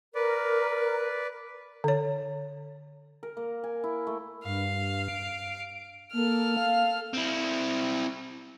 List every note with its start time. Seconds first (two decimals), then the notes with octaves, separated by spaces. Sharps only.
0.15 A#4 B4 D5
1.84 D3 C#5
3.23 A#4
3.37 A#3
3.64 G#5
3.84 E4
4.07 A3
4.44 G2 F5
5.08 D7
6.13 A#3 A4 F6
6.57 F5
7.14 C4 E4